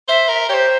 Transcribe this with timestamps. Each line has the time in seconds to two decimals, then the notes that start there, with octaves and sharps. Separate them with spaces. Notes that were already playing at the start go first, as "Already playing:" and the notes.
0.08 C5 E5
0.29 A#4
0.49 G4 C5 C#5